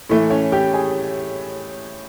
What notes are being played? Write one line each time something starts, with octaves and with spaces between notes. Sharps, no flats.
A2 E3 A3
C#4 C#5
G4 G5
G#4 G#5